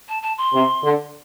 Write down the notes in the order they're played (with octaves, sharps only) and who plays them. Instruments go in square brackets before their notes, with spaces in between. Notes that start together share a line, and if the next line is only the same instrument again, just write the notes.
[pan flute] A5
A5
C6
[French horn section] C3
D3